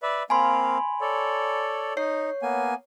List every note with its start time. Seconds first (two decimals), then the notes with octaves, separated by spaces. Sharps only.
0.03 B4 D5 E5
0.30 A#3 C4 F5 G#5 B5 C6
1.01 A4 C#5 D5
1.97 D#4 C#5 C7
2.42 A#3 B3 G#5